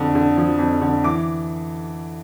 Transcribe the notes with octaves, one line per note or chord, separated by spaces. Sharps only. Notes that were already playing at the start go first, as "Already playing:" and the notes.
Already playing: F2 D3
D3
F3
F2
D3
E3 D6